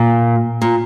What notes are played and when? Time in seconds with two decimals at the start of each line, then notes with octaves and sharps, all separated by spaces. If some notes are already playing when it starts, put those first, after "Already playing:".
Already playing: A#2
0.62 A#2